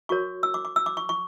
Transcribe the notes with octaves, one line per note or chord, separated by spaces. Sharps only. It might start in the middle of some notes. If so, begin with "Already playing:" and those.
F#4 A#4 C#5 C#6
E6
D6
D6
E6
D6
C#6
C#6